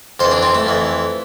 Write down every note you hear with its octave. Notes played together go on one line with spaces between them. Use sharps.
F2 E3 C5
D4
C4
A3
F2 E3